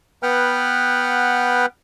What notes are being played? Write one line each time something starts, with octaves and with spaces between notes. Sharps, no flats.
B3 B4 F#5 G5 F6